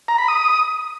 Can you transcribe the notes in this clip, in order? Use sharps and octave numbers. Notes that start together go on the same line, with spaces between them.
A#5
B5
D#6